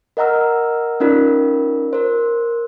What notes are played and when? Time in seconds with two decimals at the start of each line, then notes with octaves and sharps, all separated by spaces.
0.17 A#4 D#5 F#5 A#5 E6 F6
1.00 C#4 D#4 F4 A#4 D5
1.93 A#4 C5